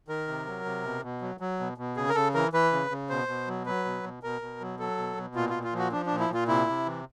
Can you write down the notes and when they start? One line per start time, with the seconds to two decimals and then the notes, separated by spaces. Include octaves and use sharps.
0.08 D#3 A#4
0.28 C3
0.47 F#3
0.65 C3
0.84 B2
1.03 B2
1.21 F#3
1.40 F#3
1.60 B2
1.78 B2
1.97 C#3 G#4
2.09 A#4
2.15 C#3 A4
2.34 E3 A#4
2.53 E3 B4
2.73 C#3
2.91 C#3
3.09 B2 C5
3.28 B2
3.47 F#3
3.66 F#3 B4
3.85 B2
4.03 B2
4.23 B2 A#4
4.42 B2
4.61 F#3
4.79 F#3 A4
4.97 B2
5.17 B2
5.35 A#2 F4
5.49 F4
5.54 A#2
5.64 F4
5.73 F3
5.78 F#4
5.92 F3 D4
6.06 D4
6.11 A#2
6.20 E4
6.29 A#2 F4
6.48 C3 E4
6.68 C3
6.86 E3